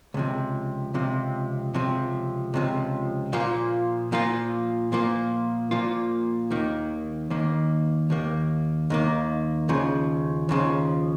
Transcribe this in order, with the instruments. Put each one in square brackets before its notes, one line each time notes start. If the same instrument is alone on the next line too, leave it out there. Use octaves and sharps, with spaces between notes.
[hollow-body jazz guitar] C#2 C3 F3
C#2 C3 F3
C#2 C3 F3
C#2 C3 F3
A#2 F3 A#3 F4
A#2 F3 A#3 F4
A#2 F3 A#3 F4
A#2 F3 A#3 F4
D#2 D#3 A#3
D#2 D#3 A#3
D#2 D#3 A#3
D#2 D#3 A#3
D#2 C#3 F3
D#2 C#3 F3